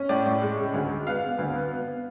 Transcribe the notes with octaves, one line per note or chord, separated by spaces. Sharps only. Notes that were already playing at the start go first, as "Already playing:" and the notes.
Already playing: C#4
A2 D5
A2
G#3
C#3
D2
G#3
B3 F5
B3
D2
B3
B3